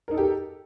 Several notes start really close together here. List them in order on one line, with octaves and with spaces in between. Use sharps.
A#4 D#4 A4 G4